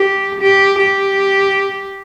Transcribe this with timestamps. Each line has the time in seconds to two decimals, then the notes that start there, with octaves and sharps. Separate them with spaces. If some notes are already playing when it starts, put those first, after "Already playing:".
Already playing: G4
0.40 G4
0.79 G4